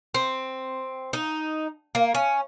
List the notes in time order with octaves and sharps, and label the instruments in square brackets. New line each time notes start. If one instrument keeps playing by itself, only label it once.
[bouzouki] C4
D#4
A#3
C#4